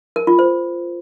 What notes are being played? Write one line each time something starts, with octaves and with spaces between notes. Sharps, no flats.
A#4
F4
C5